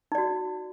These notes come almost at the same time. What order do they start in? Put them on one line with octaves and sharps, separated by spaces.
D#4 D5 F#4